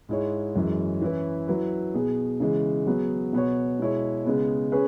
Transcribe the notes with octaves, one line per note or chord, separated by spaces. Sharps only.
G#2 G#3 E4 C#5
F#2 E3 G#3
E3 C#4 E4 B4
F#3 E4 B4
B2 B3 G#4
C#3 E3 G#3
F#3 B3 G#4
B2 B3 F#4 C#5
B2 G#3 E4 C#5
C#3 G#3 B3
C#4 G#4 B4